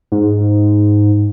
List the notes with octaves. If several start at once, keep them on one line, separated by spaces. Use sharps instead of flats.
G#2